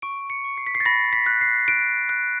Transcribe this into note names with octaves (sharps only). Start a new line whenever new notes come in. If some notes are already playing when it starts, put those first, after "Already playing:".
C#6 D7
C#7
C#6
C7
B6
C7
A6
B5 A#6
B6
F#6
C7
F#6 D7
F#6